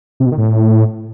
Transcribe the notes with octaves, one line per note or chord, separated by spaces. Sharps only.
C3
B2
D#3
A2